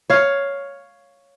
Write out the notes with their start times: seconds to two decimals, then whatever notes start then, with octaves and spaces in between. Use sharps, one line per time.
0.10 C#5 F5